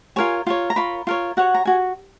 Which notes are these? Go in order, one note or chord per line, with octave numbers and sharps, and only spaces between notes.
F4 A#4 C#5 G#5
F4 A#4 C#5
A#5
F4 A#4 C#5 B5
F4 A#4 C#5
F#4 C#5 F#5
A#5
F#4 G#5